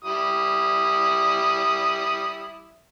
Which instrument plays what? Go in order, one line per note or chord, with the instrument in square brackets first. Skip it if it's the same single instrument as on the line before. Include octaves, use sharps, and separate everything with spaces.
[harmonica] G3 E4 D#6